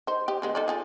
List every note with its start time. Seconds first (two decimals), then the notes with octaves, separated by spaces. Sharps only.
0.07 D#4 C5
0.28 G4 D#5
0.42 D3 G#3 B3
0.55 D#4 A4 D5
0.68 F4 G#4 A4